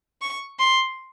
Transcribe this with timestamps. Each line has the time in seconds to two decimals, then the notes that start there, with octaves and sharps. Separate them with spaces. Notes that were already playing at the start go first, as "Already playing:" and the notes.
0.22 C#6
0.59 C6